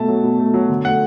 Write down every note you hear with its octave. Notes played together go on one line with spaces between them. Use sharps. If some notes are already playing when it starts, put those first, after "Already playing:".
Already playing: B2 A3 A5
F#3
B2
A3
F#3
D3
A3 F#5